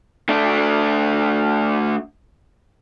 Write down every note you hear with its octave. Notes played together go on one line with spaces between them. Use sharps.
A3 D4